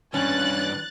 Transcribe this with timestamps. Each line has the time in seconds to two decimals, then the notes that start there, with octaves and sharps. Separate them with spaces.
0.14 G2 E3 C#4 F#6 A6